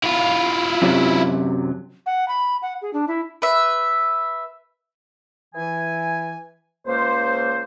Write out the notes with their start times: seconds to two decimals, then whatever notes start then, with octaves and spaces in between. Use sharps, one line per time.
0.04 E4 F4
0.82 F#2 C3 F#3
2.06 F#5
2.28 B5
2.62 F#5
2.81 G#4
2.93 D4
3.08 E4
3.42 B4 E5
5.55 E3 G#5
6.87 C#2 A#3 C5